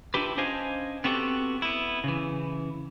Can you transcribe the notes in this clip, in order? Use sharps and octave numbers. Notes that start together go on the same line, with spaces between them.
D4 E4 F4 G4 B4
C#4 D4 C5 D#5 F5 G#5
B3 C4 F#4 G4 A4
B3 E4
C#3 E3